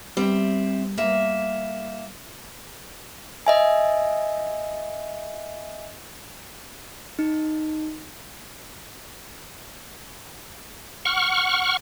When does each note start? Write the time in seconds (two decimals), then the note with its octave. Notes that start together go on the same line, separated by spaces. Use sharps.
0.17 G3 C4 E5
0.98 A#3 E5
3.47 D#5 E5 G#5
7.19 D#4
11.05 F#5 C#6 F6